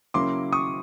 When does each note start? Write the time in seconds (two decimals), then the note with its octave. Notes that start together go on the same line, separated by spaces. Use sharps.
0.14 C#3 F#3 A#3 C#4 E4 C6 D6
0.53 C#6 D#6